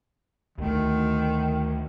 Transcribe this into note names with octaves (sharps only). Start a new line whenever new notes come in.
D2 D#3 A3